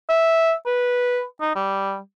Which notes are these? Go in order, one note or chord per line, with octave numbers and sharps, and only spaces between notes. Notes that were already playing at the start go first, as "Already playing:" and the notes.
E5
B4
D#4
G3